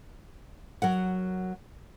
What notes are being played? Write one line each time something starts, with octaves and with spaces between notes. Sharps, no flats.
F#3 A#4 F#5